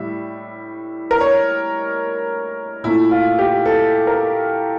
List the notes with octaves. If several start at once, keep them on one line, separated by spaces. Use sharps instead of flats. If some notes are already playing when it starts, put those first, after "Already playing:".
Already playing: A2 G3 E5
A#4
C#5
A#2 A3 E4
F4
G4
A4
A#4